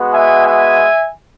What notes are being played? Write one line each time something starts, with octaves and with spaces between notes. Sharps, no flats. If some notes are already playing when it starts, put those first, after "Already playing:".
Already playing: G#3 B3 F#4
E5 G#5
E5 G#5